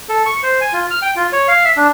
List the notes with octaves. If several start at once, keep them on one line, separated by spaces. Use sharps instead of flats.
A4
C#6
C5
G#5
F4
F6
G5
F4
C#5
F5
E5
D4